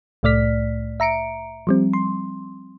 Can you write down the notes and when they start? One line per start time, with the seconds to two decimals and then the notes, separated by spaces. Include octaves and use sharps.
0.23 C2 A2 A3 D5 F6 B6
1.00 E5 A#5 C#7 D7
1.67 F3 G3 C4
1.93 C6